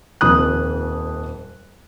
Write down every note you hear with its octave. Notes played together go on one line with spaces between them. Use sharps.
D#1 F2 D#6 F#6